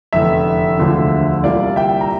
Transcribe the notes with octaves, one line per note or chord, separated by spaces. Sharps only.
F1 E2 D3 E5
E1 D2 D3 F3
C2 A#2 G3 A#3 D5 F5
E5 G5
A#5